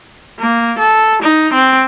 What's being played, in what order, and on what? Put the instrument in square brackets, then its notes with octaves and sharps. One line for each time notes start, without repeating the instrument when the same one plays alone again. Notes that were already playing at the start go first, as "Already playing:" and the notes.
[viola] A#3
A4
D#4
C4